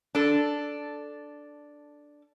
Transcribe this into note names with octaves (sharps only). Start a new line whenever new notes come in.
D4 A4